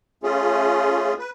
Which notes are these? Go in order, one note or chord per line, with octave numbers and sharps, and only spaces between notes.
A3 C#4 F4 G#4
B4